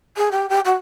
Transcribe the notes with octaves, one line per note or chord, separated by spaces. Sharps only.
G#4
G4
G4
F#4